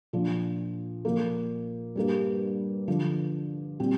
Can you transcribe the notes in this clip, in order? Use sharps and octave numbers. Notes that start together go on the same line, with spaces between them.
A#2 F3 D4
A#2 F3 A#3
G2 G3 A#3
D3 F3 D4
A#2 G3 C4